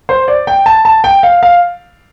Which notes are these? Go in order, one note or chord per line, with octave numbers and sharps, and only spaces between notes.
C5
D5
G5
A5
A5
G5
F5
F5